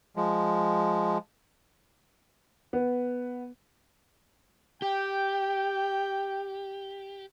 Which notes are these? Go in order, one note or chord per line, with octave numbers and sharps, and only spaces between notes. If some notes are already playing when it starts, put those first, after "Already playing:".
F3 G#3
B3
G4 G5